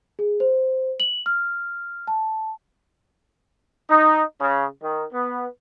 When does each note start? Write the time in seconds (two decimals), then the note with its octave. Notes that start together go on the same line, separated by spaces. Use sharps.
0.19 G#4
0.40 C5
1.00 F#7
1.26 F6
2.07 A5
3.90 D#4
4.41 C#3
4.83 D#3
5.14 B3